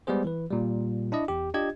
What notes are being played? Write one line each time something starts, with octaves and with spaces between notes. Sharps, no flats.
G3 G#3 B3 G#4 C5
E3 B4
A#2 G3
D4 E4 D5 D#5
E2 G4
D4 F4 G4 D#5 G#6